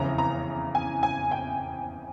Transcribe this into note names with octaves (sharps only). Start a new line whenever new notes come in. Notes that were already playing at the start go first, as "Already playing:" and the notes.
Already playing: F1 E2 C#3 E3 A#5
A#5
G#5
G#5
G5